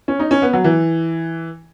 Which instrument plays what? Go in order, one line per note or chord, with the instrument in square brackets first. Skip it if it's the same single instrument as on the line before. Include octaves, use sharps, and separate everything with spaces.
[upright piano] C#4
D#4
C#4
B3
F#3
E3